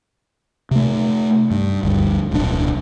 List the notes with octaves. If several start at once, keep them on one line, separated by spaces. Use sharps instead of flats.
C3 A3
G2
G1 D2 G2
D1 B1 A2 D4